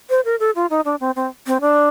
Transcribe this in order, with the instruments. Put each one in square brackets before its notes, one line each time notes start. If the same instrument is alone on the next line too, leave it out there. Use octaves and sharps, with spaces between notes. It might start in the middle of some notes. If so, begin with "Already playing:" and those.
[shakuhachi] C5
A#4
A4
F4
D#4
D4
C4
C4
C4
D4